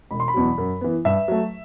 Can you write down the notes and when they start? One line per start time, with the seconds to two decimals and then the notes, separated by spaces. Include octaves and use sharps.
0.11 E1 B5
0.20 C6
0.28 B5
0.34 E2 B2 F#3
0.58 F#2
0.81 E3 B3
1.05 G2 E5
1.28 F#3 A3